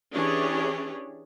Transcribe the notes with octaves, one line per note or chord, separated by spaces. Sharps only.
E3 C#4 D4 G4 G#4 C#5